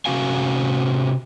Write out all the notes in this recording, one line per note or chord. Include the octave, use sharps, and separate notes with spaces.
C3 C#4 F#4 F5 G#5